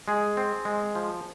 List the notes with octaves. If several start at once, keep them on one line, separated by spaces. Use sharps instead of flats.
G#3 G#4
C4
G#3
F3